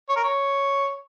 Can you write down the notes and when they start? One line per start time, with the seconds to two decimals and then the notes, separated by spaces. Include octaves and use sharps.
0.09 C#5
0.17 A#4
0.24 C#5